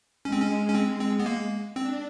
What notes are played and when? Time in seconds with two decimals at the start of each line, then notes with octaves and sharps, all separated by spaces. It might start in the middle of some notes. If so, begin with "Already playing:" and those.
0.25 G#3 C#4
0.32 C4
0.41 C#4
0.69 C#4
0.75 C4
1.01 C4
1.19 B3
1.26 A#3
1.76 C4 D4